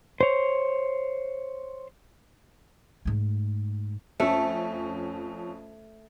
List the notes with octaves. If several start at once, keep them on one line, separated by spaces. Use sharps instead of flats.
C5 C#5
G#2 A3
F2 A3 C#4